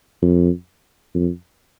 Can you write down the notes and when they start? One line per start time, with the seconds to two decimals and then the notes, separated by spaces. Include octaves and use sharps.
0.23 F2
1.15 F2